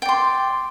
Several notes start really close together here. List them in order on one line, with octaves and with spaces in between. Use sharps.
G5 D5 C6